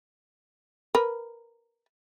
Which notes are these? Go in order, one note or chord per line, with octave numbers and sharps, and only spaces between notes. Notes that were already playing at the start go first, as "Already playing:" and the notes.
A#4 B4